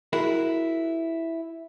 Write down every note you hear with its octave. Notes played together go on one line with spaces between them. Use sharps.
E4 F#4 G#4 A#4